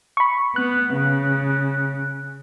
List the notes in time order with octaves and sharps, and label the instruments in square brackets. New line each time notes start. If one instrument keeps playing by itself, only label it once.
[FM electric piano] B5 C#6
[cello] B3 [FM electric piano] F#6
[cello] C#3